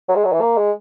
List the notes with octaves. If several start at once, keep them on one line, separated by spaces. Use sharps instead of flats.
F#3
G#3
F#3
E3
A#3
G#3